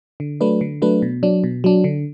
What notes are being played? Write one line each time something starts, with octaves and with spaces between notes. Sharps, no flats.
D3
F#3 A3 D4 B4
D3
F#3 A3 D4 B4
B2
F#3 D4
B2
F#3 D4
D3